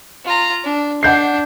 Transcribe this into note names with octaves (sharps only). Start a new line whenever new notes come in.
F4 A#5
D4
D4 F#5 G6 C7